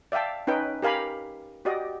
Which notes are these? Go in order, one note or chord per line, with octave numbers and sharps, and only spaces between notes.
D5 E5 F5 G5 A5
C#4 D#4 B4 G5
G4 A#4 F5 G#5 B5
F#4 G4 D5 D#5